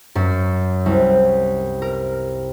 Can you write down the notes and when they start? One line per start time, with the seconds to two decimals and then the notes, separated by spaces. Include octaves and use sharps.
0.15 F#2
0.86 C2
1.82 A#4